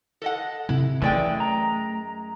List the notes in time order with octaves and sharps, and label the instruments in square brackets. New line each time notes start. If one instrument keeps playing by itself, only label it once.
[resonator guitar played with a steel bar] A4 D#5 F#5
[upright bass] C3 [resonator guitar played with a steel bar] E4
[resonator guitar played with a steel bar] F#2 G#3 G5 [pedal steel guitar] E3 D5 [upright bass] A3
[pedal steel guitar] A#5